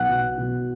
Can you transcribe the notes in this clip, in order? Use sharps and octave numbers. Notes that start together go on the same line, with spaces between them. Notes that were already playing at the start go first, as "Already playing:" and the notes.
Already playing: B1 F#5 F#6
B2
B2